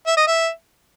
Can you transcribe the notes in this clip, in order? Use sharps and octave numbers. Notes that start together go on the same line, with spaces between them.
E5
D#5
E5